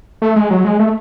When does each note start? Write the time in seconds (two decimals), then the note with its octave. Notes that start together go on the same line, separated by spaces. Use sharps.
0.22 A3
0.36 G#3
0.51 F#3
0.64 G#3
0.79 A3